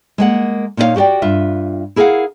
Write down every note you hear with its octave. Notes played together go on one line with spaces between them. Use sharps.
G#3 A#3 F#5
A#2 A#3 D#4 E4 C#5 F5
F#4 G4 A#4 D5 G5
G2 F4 E5
E4 G#4 A#4 C#5 F5 F#5